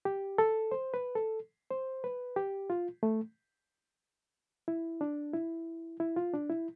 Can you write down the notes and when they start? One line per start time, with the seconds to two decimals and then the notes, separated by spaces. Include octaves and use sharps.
0.05 G4
0.38 A4
0.71 C5
0.94 B4
1.15 A4
1.71 C5
2.04 B4
2.36 G4
2.70 F4
3.03 A3
4.68 E4
5.01 D4
5.34 E4
6.00 E4
6.16 F4
6.34 D4
6.50 E4